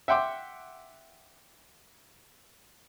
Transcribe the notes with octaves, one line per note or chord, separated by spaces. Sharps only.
E5 F#5 G5 C6 D6